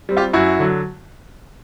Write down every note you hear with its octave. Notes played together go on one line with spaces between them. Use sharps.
G3 C4
F4 G4
F#2 E4 F#4
D3 F#3